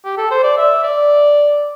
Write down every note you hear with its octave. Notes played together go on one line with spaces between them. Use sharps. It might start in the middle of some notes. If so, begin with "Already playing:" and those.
G4
A4
C5
D5
E5
D5